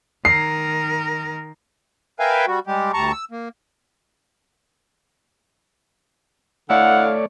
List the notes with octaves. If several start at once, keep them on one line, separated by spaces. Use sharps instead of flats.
D#3 A#4 C7
A#4 B4 E5 F5 G5 G#5
G3 F#4
G3 G#3 G4
D2 G3 A5 A#5 C#6
E6
A#3
D3 A3 E4 C#5 D5 F5 F#5